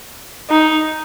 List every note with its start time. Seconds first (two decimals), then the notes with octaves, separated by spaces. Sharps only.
0.50 D#4